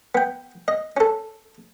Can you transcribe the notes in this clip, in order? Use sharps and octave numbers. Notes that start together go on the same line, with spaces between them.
B3 G5
D#5
C#4 A4